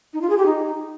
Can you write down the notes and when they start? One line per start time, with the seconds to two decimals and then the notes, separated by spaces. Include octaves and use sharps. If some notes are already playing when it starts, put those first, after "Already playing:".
0.14 D#4
0.22 F4
0.30 G#4
0.38 G4
0.46 D#4